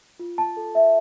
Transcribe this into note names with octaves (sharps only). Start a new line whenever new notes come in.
F4
A5
A4
E5